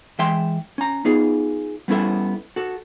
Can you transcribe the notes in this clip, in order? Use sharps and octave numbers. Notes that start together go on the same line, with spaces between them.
E3 G#3 E5 G5 C6
C#4 A#5
B3 D#4 F4 G#4
G3 B3 C#4 E4 A4 E5
F#4 A4